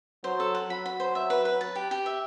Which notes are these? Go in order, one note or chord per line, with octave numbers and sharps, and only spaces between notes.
F#3 C5
A4
F#5
F#3 B5
B5
C5
E5
B4
B4
A5
G4
G4
E5